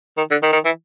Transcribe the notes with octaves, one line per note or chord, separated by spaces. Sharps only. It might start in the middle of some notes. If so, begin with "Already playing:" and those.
D#3
D3
D#3
D#3
E3